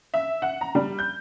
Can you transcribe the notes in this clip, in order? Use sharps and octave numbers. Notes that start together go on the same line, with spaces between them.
E5
F#5
A#5
G3
G6